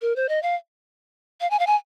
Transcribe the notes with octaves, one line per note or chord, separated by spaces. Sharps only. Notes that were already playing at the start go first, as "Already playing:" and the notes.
A#4
C5
D#5
F5
F5
G#5
F5
G#5